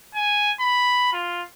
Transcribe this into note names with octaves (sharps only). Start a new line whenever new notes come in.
G#5
B5
F4